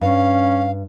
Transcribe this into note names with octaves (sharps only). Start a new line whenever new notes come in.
G2 C#4 F5